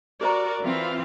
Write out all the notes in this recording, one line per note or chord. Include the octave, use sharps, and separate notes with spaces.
F#4 G4 A#4 C5 D5 A#5
E3 C4 F4 F5